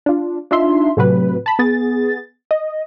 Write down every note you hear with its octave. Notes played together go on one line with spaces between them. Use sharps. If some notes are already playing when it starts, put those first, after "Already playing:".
D4 F4
D4 D#4 F4 E5 C6
A2 C3 F#3 B4
A5 B5
B3 G#4 A6
D#5